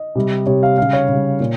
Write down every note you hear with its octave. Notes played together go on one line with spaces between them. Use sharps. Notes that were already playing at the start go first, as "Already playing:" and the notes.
Already playing: D#5
C3 G3
C3 G3 C#5
F5
C#3 G3 F5
C#5
C#3 G3
A#2